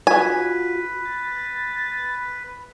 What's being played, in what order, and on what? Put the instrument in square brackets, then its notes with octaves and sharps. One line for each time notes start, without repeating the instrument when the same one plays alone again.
[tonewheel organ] F4 F#4 [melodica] B4 [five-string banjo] G#5
[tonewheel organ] A6